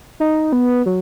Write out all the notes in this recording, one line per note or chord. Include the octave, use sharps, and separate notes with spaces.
D#4
B3
F#3